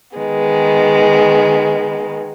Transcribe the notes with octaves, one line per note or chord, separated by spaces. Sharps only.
D#3 G#3 B3